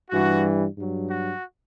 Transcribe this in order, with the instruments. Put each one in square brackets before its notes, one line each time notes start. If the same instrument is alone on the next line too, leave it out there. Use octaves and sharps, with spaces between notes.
[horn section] G2 E3 G3 F#4
G2 F#3
F#4